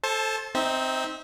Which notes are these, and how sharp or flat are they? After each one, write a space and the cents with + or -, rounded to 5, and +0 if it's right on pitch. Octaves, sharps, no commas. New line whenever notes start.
A4 +0 C5 +25 A5 -25
C4 +0 D#4 +0 E5 -30